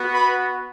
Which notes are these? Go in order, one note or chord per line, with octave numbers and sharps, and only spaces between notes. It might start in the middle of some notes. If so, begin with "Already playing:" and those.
Already playing: B3 F#4
B4 B5